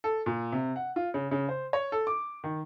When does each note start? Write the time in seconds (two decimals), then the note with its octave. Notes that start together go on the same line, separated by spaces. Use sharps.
0.04 A4
0.26 A#2
0.52 C3
0.76 F#5
0.96 F4
1.14 C#3
1.31 C#3
1.49 C5
1.73 C#5
1.92 A4
2.07 D6
2.44 D#3